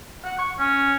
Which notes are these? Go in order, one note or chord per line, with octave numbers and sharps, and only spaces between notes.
F#5
C#6
C#4